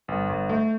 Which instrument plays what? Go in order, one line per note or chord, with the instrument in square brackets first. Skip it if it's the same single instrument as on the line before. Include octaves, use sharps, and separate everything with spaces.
[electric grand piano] G1
G1
A3